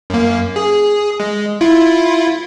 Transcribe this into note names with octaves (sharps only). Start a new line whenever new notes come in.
F#2 A#3
G#4
G#3
E4 F4